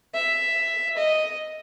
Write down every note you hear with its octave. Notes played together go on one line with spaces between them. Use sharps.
E5
D#5